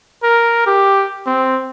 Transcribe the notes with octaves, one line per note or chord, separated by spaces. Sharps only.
A#4
G4
C4